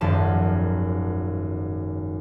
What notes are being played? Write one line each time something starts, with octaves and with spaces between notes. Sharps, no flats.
D#1 G#1 F#2 F3 B3 A5